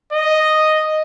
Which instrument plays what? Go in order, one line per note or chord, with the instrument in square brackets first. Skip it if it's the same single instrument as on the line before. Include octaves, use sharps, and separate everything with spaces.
[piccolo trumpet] D#5